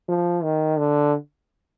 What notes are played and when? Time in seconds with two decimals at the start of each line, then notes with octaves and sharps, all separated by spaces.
0.08 F3
0.44 D#3
0.78 D3